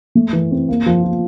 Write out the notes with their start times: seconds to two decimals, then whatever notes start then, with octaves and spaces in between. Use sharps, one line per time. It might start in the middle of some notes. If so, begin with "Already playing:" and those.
0.15 A3
0.33 E3
0.51 C4
0.68 A#3
0.86 F3
1.03 F4